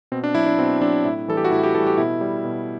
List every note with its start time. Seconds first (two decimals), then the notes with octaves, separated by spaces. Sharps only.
0.12 B2 C4
0.24 D4
0.35 F#3 E4
0.46 D4
0.58 B2 C4
0.81 F#3 D4
1.05 A2 E4
1.28 E3 G3 A4
1.37 G4
1.45 F#4
1.51 A2 E4
1.63 G4
1.75 E3 G3 A4
1.87 G4
1.97 B2 E4
2.21 G3
2.45 B2